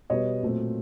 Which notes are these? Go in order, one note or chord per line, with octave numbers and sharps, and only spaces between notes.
B2 G3 B3 C#5 D#5
A#2 F#3 A3 C4